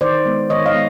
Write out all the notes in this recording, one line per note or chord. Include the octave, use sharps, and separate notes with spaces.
D#3 C5 D5
G#3 B3
D#3 C#5 D#5
D#5 F5
G#3 B3